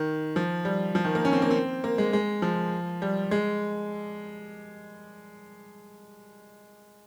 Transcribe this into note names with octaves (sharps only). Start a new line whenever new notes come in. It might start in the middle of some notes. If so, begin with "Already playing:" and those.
Already playing: D#3
F3
G3
F3
D#3
A#3
C#4
C4
A#3
C4
A#3
G#3
G#3
F3
G3
G#3